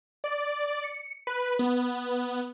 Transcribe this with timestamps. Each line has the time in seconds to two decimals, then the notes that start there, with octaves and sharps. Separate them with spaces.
0.24 D5
0.84 C#7
1.27 B4
1.59 B3